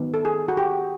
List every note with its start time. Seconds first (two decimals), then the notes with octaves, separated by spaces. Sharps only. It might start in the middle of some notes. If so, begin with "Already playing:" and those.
Already playing: D#3 F#3 B3
0.14 A4
0.25 G#4
0.48 F#4
0.57 G4